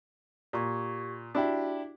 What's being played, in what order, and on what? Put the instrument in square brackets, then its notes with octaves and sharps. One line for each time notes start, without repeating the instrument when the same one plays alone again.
[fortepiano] A#2 [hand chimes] G4 C#6 G#6
[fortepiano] D4 E4 G4 [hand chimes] F#4